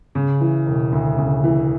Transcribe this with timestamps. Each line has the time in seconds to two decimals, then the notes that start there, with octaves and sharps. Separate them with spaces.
0.15 C#3
0.41 E3
0.67 E1
0.92 D2
1.18 C#3
1.44 E3